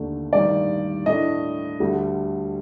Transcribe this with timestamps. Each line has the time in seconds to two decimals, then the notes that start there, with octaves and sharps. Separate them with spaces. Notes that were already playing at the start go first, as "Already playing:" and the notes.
Already playing: D#2 D3 A3 D4
0.33 A1 G2 D#3 D5
1.06 A2 A3 D4 D#5
1.80 D2 D3 G3